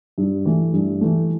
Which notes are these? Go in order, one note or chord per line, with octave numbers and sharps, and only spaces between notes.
G2
E3 A3
G2
E3 A3